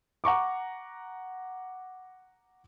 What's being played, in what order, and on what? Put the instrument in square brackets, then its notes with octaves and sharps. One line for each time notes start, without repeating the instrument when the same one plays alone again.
[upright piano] F#5 A#5 C#6 D6